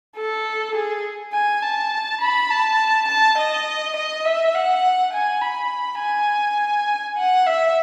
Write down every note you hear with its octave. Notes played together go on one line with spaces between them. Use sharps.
A4
G#4
G#5
A5
B5
A5
A5
D#5
D#5
E5
F#5
G#5
B5
G#5
F#5
E5